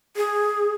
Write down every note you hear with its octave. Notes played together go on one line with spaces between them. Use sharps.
G#4